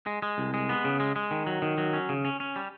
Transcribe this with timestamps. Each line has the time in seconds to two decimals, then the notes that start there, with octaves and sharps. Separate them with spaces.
0.06 G#3
0.22 G#3
0.38 C2
0.54 G#3
0.69 B3
0.84 C#3
1.00 G#3
1.16 G#3
1.31 D#3
1.47 F#3
1.62 D#3
1.78 F#3
1.93 C#4
2.09 C#3
2.25 C#4
2.40 C#4
2.56 G3